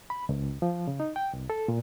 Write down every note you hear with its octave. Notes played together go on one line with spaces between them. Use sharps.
B5
C#2
F3
C#3
D#4
G5
C2
A4
A#2